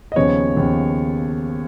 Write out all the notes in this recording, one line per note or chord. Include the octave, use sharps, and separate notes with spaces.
D#5
D#2 C#3 F3 B3 C#5
D#2 C#3 F3 B3